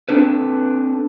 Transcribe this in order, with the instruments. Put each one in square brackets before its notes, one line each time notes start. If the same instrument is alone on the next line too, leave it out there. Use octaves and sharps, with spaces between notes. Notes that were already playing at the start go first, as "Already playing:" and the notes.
[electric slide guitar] C4 D4 A4 B4